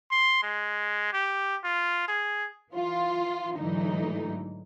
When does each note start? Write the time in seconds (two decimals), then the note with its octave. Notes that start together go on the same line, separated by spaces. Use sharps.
0.11 C6
0.43 G#3
1.13 G4
1.64 F4
2.08 G#4
2.71 E3 F4
3.56 G#2 D3 E3 F#3 A3 D#4